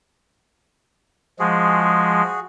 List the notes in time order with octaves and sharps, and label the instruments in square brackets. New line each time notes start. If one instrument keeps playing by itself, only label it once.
[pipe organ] F3 G#3 [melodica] F#4 G#4